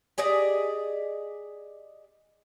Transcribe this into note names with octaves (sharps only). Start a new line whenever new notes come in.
G4 G#4 D5 D#5